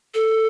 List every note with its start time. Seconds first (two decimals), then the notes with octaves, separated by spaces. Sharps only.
0.14 A4